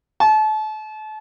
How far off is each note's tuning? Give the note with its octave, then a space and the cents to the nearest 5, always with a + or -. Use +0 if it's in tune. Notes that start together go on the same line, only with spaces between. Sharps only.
A5 -35